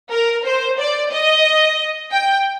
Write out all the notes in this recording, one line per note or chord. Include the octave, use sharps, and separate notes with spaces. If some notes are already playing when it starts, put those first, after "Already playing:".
A#4
C5
D5
D#5
G5